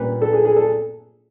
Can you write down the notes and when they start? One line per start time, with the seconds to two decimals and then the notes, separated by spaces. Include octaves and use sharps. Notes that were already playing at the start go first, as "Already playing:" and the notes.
Already playing: A#2 G3 A#3 C#4 B4
0.22 A4
0.33 G#4
0.45 G#4
0.57 A4